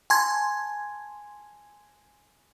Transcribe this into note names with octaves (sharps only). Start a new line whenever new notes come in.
G#5 A5 C6 G#6